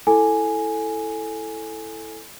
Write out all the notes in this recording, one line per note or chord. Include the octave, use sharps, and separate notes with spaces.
E4 A4 G#5